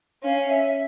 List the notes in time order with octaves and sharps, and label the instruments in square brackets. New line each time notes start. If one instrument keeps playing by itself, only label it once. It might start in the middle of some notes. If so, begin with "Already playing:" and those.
[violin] C#4 [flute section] F5
[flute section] E5